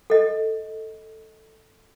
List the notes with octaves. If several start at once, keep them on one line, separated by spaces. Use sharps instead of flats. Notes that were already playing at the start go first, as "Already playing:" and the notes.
A4 D#5